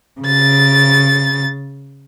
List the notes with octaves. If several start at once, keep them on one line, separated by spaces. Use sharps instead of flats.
C#3 A6